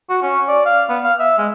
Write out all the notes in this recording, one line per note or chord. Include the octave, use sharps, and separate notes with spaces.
F#4
C#4
D5
F5
B3
F5
E5
G#3